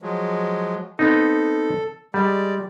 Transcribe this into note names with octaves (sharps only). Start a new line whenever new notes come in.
F3 F#3 G#3
B3 C4 D#4 A4
G3 G#3 D5